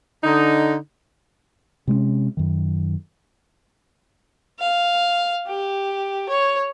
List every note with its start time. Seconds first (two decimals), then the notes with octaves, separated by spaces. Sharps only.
0.24 D3 D#4
1.87 C3 G#3 A3 C#4
2.37 F#2 D#3
4.59 F5
5.47 G4
6.29 C#5